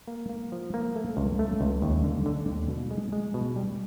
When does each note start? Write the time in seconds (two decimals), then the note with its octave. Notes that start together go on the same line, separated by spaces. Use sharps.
0.08 A#3
0.29 A#3
0.52 F3
0.74 A#3
0.96 A3
1.17 C#2
1.39 A3
1.61 C#2
1.82 D#2
2.04 D3
2.26 D3
2.48 D#2
2.69 B2
2.91 G#3
3.12 G#3
3.34 B2
3.56 G3